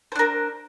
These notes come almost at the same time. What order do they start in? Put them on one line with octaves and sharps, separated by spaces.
C5 D4 A#4